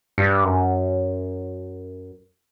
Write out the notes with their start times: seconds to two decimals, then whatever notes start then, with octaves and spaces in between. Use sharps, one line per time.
0.18 G2
0.44 F#2